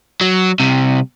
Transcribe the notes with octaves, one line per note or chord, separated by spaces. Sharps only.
F#3
C2 C3